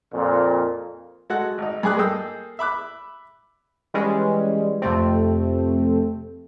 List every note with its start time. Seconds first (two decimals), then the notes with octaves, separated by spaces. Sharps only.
0.13 F2 A#2
1.30 G#3 F#4 A4 F#5
1.58 G#1 D#4
1.83 G2 G#3 G#4 D6 F#6
1.97 A#3 G#4 A4 D#5 G5 E6
2.59 E5 B5 D6 F#6
3.94 E3 G3 G#3 C#4
4.82 F2 C3 A3 C4